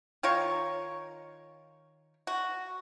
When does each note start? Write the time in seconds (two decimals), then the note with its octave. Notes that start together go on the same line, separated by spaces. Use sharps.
0.23 D#3 F4 A#4 C#5
2.27 F#4